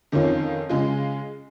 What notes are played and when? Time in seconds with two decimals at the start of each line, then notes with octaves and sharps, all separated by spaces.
0.12 F2 D#3 C#4 F4
0.69 C#3 G#3 F4